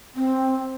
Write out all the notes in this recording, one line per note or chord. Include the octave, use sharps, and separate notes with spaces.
C4